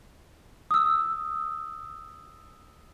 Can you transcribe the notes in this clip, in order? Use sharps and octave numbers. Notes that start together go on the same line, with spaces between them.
D#6 E6